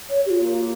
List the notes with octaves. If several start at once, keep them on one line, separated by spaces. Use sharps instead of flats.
C#5
G4
F4
A#3